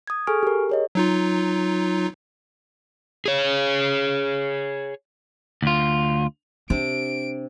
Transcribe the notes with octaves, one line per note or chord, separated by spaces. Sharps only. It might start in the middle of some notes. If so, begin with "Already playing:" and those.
D#6 G#6
G#4 A4 G#5 C#6 F6 D7
G4 A#4
G#4 C#5 D#5
F#3 D#4 F4
G#4 C#5
D2 F4
C3 D4 D7